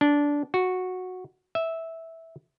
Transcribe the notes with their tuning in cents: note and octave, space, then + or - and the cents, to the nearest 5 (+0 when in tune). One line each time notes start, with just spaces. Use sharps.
D4 -15
F#4 -10
E5 -10